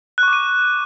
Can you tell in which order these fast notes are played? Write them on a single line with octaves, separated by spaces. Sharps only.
F#6 C#6 D6 D#7